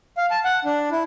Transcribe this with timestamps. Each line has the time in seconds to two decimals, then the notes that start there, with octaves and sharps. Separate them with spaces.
0.17 F5
0.31 A5
0.44 F#5
0.65 D4
0.91 E4